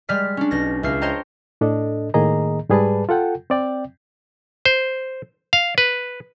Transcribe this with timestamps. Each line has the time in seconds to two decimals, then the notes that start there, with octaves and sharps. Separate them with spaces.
0.09 G3 G#3 D5 F6 B6
0.37 C#4 D4
0.51 B1 A6 A#6
0.83 C#2 D4 E5 F6 C7
1.01 C5 C#5 D#5 G5 A5 A#5
1.61 A2 D4 A4 D#5
2.14 A2 D#3 A#3 G#4 D#5 A#5
2.69 G#2 G3 G#4 B4 D5 A5
3.09 F4 A4 F#5 G5
3.50 C4 D5 G5
4.66 C5
5.53 F5
5.78 B4